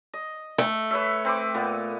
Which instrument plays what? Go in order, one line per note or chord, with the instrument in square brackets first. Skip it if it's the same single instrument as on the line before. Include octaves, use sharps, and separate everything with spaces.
[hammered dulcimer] D#5
[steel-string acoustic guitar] A3
[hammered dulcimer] B4 C#5 E5
C4 B4 D6
A#2 B3